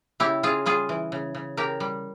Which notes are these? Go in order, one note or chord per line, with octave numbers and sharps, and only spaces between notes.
C#3 E4 G4
C#3 F4 G#4
G3 F4 G#4
E3
C#3
C#3
C#3 G4 A#4
G3